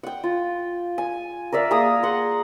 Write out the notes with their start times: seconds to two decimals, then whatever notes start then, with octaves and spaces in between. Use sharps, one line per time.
0.03 F#5 G5
0.24 F4
0.98 G#5
1.52 A#4 D5 E5 F5
1.71 A#3 G#4 A#4 D#6
2.03 F#5 C6